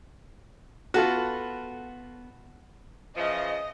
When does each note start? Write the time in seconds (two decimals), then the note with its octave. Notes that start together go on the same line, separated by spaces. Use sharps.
0.94 B3 F4 F#4 A4
3.17 C#3 E3 F3 D#5